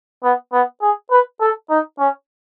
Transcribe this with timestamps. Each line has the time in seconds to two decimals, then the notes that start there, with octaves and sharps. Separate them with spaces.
0.24 B3
0.52 B3
0.82 G#4
1.11 B4
1.41 A4
1.70 D#4
1.99 C#4